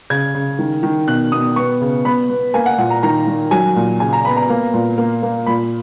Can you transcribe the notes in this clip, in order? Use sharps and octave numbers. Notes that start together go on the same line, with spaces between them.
C#3 G#6
C#3
D#3
D#3
B2 F#6
B2 D#6
B3 C#6
C#3
B3 B5
B3
A#3 G#5
F#5
A#2 F#5
A#5
D#3 A#5
D#3
F#3 G#5
A#2
C#3 G#5
A#5
B3 B5
A#5
A#3
A#2
A#3
A#3
A#2 B5